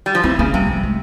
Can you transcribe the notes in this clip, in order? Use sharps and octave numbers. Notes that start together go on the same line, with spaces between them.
G3
F3
E3 C4
C#3 A#3
C3 G3
F3
G#3